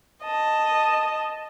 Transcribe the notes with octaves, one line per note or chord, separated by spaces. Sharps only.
D#5 A5